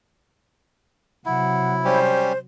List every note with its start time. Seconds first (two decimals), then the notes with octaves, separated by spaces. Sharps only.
1.26 C3 F#3 E4 F#5
1.85 G3 C#4 G4 C5